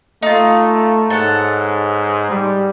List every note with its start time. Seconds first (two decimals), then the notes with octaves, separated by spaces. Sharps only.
0.23 A3 D#4 F4
1.10 G#2 A4 C#5 F#5
2.31 G3